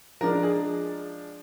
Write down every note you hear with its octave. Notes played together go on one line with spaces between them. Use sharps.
F3 G#3 D4 A#4
G#4